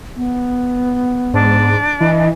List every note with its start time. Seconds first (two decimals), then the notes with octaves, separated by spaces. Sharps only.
0.16 B3
1.34 G#2 D4
2.00 E3 D#5